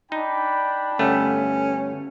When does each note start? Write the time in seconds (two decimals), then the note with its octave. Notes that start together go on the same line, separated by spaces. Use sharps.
0.12 D4 D#4 G5 B5
0.99 G1 A3 B3 C#4